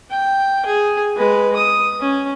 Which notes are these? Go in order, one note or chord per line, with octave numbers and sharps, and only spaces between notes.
G5
G#4
G#3 B4
D#6
C#4